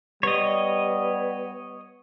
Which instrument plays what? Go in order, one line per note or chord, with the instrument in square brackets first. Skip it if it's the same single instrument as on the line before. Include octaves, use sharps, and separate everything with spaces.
[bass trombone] G3 [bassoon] B3 [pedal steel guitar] C#5 D#5